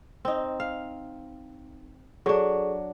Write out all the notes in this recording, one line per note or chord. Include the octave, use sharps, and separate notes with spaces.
C4 D#4
F5
F#3 D4 G#4 A4 C#6